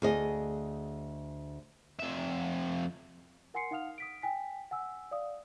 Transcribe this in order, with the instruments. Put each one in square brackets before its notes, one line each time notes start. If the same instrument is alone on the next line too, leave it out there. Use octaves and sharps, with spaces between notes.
[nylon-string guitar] D2 G#4 D#5
[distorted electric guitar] F2 E5
[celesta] A#4 F#5 G#5 C6 C7 C#7
D#4 F5 F#5 D#6 F6 F7
D#6 B6 D7
G5 G#5 B6
F#5 G#5 E6
D5 F5 D#6